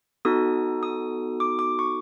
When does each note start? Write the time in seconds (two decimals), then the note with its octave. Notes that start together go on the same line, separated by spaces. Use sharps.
0.25 B3 D#4 F#4 A4 D#6
0.83 D#6
1.40 D6
1.59 D6
1.79 C#6